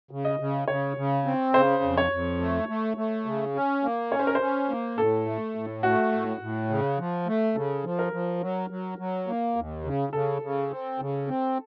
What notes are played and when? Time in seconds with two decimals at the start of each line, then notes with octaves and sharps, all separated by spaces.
0.11 C#3
0.25 D#5
0.39 C#3
0.68 C#3 C#5
0.97 C#3
1.25 C4
1.54 C#3 C5
1.83 F2
1.97 C#5
2.11 F2
2.40 A3
2.69 A3
2.97 A3
3.26 C#3
3.55 C#4
3.83 A#3
4.12 C#4 C#5
4.19 C5
4.27 A#4
4.35 C5
4.41 C#4
4.69 A#3
4.98 A2 A4
5.26 A3
5.55 A2
5.83 A3 F#4
6.12 A2
6.41 A2
6.69 C#3
6.98 F3
7.27 A3
7.56 C#3 A4
7.84 F3
7.99 A#4
8.13 F3
8.41 F#3
8.70 F#3
8.98 F#3
9.27 A#3
9.56 D#2
9.84 C#3
10.13 C#3 A4
10.42 C#3
10.71 C4
11.00 C#3
11.28 C4